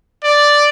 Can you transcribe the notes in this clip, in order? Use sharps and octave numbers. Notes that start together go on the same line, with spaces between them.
D5